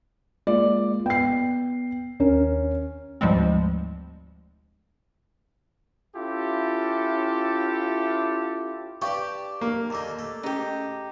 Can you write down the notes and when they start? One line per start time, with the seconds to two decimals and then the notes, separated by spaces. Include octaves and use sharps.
0.47 G#3 A#3 F4 D5
1.06 B3 G5 C7
2.20 D#2 C#4 A#4
3.21 D2 G#2 F3 G3 G#3 C4
6.16 C#4 E4 F4 G4 A4
9.02 D4 G4 B4 D5 F5 C#6
9.61 A#3
9.90 D#2 D3 D#4 A#5 D6
10.19 A3
10.43 C#4 D#4 G4 G#4